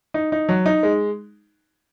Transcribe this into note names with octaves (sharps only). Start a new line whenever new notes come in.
D#4
D#4
F#3
D#4
G#3